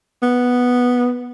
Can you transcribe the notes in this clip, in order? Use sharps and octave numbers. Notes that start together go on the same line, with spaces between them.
B3